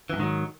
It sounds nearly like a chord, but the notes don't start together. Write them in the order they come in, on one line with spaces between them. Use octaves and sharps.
E3 F2 G#2 D#3 F#3